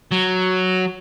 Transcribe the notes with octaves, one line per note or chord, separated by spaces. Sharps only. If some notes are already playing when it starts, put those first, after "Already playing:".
F#3